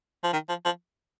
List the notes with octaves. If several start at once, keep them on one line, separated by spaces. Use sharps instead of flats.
F3
D#3
F3
F3